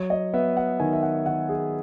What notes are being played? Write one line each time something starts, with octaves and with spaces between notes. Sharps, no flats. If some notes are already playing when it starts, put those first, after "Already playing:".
Already playing: F#3 C#5
D#5
B3 E5
F#5
D#3 G#5
E5
F#5
D#3 F#5
G#4